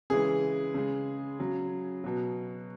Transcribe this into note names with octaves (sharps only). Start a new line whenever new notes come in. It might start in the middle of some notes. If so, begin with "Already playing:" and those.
C#3 E3 G#3 G#4
C#3 G#3
C#3 F#3
B2 F#3